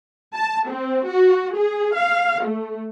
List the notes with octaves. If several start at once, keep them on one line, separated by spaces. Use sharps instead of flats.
A5
C4
F#4
G#4
F5
A3